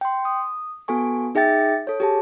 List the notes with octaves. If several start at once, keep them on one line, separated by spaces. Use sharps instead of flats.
G5 C6
D#6
B3 F#4 A4 G#5 C#6
D#4 G#4 E5 G5 A6
A4 C#5
G4 G#4 A5